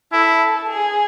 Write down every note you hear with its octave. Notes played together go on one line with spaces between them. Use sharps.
E4 A4
G#4